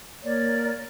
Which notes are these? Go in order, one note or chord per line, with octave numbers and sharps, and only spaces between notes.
A#3 A#4 C#5 D5